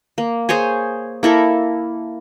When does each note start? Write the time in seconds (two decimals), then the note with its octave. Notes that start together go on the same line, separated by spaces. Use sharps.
0.18 A#3
0.49 G#4 C5 C#5 G#5
1.23 A#3 E4 A4 A#4